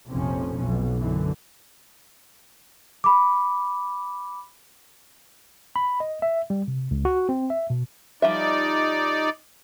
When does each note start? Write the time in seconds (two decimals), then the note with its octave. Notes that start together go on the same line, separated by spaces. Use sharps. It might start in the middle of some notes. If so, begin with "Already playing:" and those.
0.10 F1 A#1 F2 C3 F3 C#4
0.57 B1 B2
0.98 F#2 D3 E3
3.04 B5 D6
5.76 B5
6.00 D#5
6.22 E5
6.50 G3
6.68 C3
6.91 C#2
7.05 F#4
7.29 C4
7.50 E5
7.70 B2
8.22 F3 G3 D#4 D5 E5